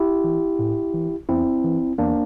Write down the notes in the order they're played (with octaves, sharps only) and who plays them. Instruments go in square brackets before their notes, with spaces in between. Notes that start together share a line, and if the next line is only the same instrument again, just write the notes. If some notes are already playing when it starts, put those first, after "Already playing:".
Already playing: [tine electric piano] E4 G4
E3
A2
E3
E2 C4 E4
E3
E2 A#3 D4